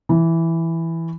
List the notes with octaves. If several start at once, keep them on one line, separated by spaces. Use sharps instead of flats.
E3